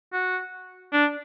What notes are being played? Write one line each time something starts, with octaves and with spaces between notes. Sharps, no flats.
F#4
D4